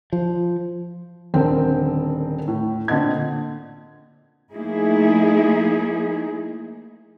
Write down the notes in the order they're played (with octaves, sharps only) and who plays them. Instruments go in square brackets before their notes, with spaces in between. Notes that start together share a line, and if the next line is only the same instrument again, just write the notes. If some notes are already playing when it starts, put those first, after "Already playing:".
[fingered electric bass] F3
[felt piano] D#1 D3 C4 A#4 G5
A2
A#2 D3 C4 D#5 G#6
[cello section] F3 A3 A#3 D#4 E4 G#4